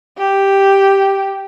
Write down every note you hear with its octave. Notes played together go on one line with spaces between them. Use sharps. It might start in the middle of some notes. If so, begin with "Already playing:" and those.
G4